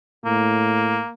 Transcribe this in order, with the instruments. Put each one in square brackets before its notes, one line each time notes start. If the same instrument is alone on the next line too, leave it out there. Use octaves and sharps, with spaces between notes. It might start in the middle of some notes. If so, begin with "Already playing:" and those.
[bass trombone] A2 [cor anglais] A#3